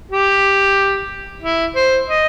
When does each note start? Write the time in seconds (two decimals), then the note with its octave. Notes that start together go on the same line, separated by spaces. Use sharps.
0.11 G4
1.43 E4
1.75 C5
2.08 D#5